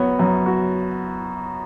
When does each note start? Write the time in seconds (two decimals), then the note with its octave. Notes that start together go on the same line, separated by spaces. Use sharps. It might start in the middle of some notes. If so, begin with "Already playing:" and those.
Already playing: F#2 B3 F#4 C#5
0.19 F#2
0.46 F#4